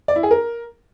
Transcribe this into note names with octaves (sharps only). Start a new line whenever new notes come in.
D5
E4
G#4
A#4